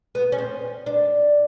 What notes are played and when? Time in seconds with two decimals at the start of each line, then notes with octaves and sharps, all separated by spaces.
0.15 B3
0.32 C#4
0.38 C4
0.86 D4